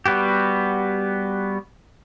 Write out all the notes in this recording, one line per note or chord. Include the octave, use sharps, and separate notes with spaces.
G3 B3 F#4 G4